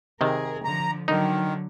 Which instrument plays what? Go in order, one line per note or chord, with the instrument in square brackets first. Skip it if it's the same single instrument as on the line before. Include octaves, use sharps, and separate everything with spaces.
[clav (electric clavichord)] C3 D#3 [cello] G#4 A#4
[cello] D3 F3 [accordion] A#5
[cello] D3 F#3 [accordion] D#3 [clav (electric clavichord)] D#4